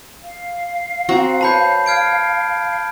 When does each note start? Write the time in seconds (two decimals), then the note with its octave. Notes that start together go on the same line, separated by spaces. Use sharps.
0.23 F5
1.09 C4 F#4 A#5
1.41 B4 C#5 A5 B5 G6
1.86 F6 G#6 D7